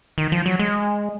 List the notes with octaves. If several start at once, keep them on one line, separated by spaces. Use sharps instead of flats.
D#3
F3
F#3
G#3